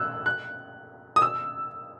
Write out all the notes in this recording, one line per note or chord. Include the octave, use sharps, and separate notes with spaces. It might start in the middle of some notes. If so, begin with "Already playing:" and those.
Already playing: E6 F#6
F#6
D#6
E6